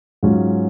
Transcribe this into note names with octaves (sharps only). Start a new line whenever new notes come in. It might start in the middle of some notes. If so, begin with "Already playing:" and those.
G#2 F#3 C#4 F4